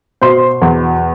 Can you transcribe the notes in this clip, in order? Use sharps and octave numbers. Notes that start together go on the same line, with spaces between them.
B2 C5 C6
E2